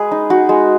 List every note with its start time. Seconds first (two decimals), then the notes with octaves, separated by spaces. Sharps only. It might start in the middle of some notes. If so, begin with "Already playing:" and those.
Already playing: G#3 G#4 B4
0.11 D#4
0.30 D#4 F#4
0.49 G#3